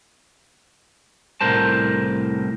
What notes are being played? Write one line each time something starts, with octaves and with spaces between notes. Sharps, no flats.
C2 A2 A#4 C5 A5